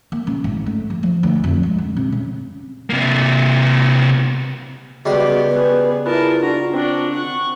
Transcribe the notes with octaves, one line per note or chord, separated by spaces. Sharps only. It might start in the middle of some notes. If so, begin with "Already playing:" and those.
A#3
C#3
G#1
A3
F3
F3
D2
F2
G#3
D3
C3
C#3
C3 A#3
C#2 G3 B3 F#4 G4 C6
B3 G#4 B4
E4 F4 G#4 A#4 B4 A5
D4 F#4 A#5
C4 D4 F#4
F#5 C#6